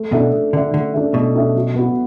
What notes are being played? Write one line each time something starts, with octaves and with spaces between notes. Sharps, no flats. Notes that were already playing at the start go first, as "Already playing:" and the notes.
Already playing: A3
B2 D4 A4 E5
A3
D3 D4 A4 E5
D3 A3
D4 A4 E5
B2 A3
D4 A4 E5
F#3
B3 F#4